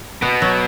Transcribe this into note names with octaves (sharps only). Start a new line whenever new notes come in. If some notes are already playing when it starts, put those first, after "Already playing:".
B2 B3
F#3